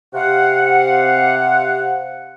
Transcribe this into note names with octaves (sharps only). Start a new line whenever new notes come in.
C3 F5 F#5